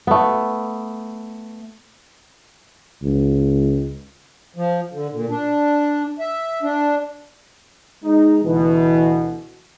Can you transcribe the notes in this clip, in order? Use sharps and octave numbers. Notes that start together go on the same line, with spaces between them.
A3 B3
C#2
F3
D3
A#2
D4
E5
D4
G#3 D#4
D2 B2 E3